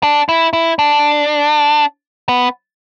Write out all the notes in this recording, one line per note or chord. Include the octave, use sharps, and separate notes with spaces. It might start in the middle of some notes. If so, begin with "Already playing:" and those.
D4
E4
E4
D4
B3